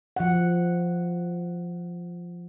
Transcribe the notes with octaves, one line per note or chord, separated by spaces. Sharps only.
F3 F#5